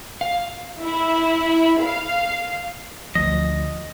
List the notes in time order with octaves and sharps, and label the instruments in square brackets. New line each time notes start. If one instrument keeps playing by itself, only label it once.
[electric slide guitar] F5
[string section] E4
F5
[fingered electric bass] D2 F3 [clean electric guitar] D#5